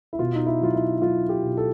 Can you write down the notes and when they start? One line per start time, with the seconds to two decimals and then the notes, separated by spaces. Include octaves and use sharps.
0.13 E4
0.19 B2 F4
0.35 D#4
0.46 E4
0.61 F#3 F4
0.74 E4
1.02 F#3 F4
1.29 G4
1.43 B2
1.57 A4